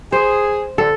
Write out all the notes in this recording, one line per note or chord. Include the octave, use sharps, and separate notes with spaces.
G#4 C5
D3 A4